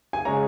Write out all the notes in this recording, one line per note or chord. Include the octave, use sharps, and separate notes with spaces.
G#5
C#3 G#3 C#4 A#5